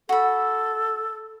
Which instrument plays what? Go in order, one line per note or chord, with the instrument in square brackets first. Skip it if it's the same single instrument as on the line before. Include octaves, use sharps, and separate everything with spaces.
[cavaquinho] F#4 B5 [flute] A4